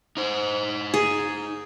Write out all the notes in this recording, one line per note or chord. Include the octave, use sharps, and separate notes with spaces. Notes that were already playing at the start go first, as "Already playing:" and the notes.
D#4 C5
G#4